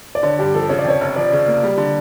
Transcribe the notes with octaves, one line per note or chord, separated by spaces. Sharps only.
D5
D3 C#5
G2 G4
F3 A4
C#3 C#5
D5
F2 C#5
F1
F3 D5
C#3
A#3
G3
D3